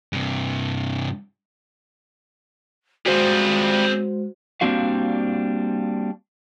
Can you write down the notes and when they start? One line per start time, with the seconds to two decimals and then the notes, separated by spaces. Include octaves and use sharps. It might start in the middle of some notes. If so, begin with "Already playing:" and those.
0.13 G2 C3
3.06 G3 G#3 C4 F4 F#4 G#4 C5
4.61 G3 A#3 C4 D4 F#4 F5